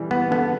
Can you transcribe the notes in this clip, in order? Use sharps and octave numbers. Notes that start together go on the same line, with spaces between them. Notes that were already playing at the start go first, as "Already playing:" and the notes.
Already playing: E3 G3
B3
D3 B3